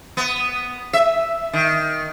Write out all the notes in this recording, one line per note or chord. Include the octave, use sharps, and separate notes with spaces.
B3
E5
D#3